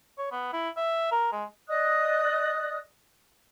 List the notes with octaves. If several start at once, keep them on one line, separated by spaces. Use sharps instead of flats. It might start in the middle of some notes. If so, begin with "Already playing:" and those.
C#5
B3
E4
E5
A#4
G#3
D5 D#5 D#6 F#6